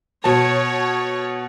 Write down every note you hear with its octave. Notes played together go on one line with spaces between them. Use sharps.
B2 C#5 A5